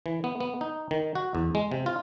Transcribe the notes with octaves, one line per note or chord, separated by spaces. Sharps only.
E3
B3
B3
D#4
D#3
F#4
E2
G#3
C3
F4